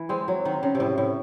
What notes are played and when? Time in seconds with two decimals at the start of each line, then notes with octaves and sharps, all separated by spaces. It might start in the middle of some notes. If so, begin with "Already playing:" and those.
Already playing: E3
0.09 G#3 C4
0.28 F#3
0.45 D#3
0.63 C#3
0.75 C3
0.80 A2
0.98 A2